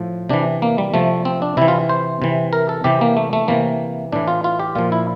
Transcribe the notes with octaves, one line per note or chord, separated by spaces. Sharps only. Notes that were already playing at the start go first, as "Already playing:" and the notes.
Already playing: A2 F3
C3 E3 D4
A#3
G3
C3 F3 A3
C4
D4
C3 E3 E4
F4
C5
C3 E3
A#4
A4
C3 E3 G4
A#3
A3
A3
C3 E3 A#3
A2 E3 D4
F4
F4
G4
A#2 F3 F4
E4